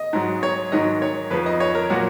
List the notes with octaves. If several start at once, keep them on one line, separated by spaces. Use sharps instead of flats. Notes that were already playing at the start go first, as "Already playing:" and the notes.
Already playing: D#5
G#2 F#3
C#5
G#2 D#3 F#3 D#5
C#5
F2 F3 B4
D#5
C#5
A#4
A#2 F#3 F#4